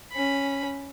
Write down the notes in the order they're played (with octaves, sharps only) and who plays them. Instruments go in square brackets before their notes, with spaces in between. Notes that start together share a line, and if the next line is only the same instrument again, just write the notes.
[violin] C#4 B5